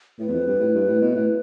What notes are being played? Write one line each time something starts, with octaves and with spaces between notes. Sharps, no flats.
A2 B4
E2
F2
G2
A2
G2
A2
B2
A2